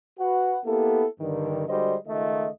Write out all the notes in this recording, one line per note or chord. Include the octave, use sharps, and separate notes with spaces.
F#4 B4 F#5
A#3 B3 E4 G4 A4
G2 D3 D#3
D3 G3 G#3 F#4 C5 D#5
C#2 D#3 A3 F4 D#5